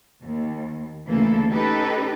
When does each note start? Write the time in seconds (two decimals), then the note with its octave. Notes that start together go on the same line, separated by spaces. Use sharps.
0.24 D#2
1.06 D2 C#3 E3 A3 A#3 A4
1.51 C#4 D#4 G4 A4 B4